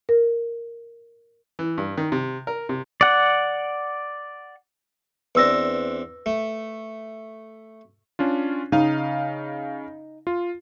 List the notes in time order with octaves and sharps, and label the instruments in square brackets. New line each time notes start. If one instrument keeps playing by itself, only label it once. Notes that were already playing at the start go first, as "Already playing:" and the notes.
[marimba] A#4
[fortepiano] E3
G2
D#3
C3
A#4
C3
[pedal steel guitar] D5 F#5
[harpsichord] E2 C4 D4 [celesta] B4 E6 A#6
[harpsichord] A3
[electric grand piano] C#4 D4 F4
[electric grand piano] C#3 F5 [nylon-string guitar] D#4
[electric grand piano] F4